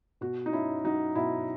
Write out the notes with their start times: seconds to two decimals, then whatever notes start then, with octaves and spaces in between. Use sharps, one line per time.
0.21 B2 F#4
0.46 D#4
0.52 C#4 E4
0.84 F#3 D#4
1.15 B2 E4